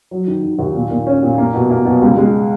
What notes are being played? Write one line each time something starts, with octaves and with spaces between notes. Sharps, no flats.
F#3
D#3
D#3
D#2
A#2
A#2
C#4
A#2
A#3
B2
A#3
B2
C#2
G#3